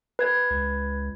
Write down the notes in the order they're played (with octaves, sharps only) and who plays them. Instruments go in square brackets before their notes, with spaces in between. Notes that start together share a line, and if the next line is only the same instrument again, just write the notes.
[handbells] B4 G#6
[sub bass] C#2